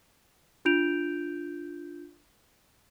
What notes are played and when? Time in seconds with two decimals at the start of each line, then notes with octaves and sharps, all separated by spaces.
0.65 D4 F4 G6 D7 F7